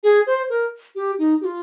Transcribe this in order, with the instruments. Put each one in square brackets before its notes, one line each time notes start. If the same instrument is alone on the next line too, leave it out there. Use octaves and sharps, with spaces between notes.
[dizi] G#4
C5
A#4
G4
D#4
G4
F4